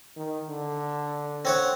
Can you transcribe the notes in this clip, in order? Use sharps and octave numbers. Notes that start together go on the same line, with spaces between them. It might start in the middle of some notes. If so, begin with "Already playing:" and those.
D#3
D3
C4 C#5 F#5